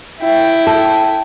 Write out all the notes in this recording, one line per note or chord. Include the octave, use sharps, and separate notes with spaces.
E4 G5
A4